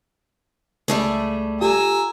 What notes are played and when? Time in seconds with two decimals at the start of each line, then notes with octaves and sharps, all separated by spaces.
0.88 C#2 G3 A3 G#4
1.61 F4 G4 A4 G#5 A#5 E6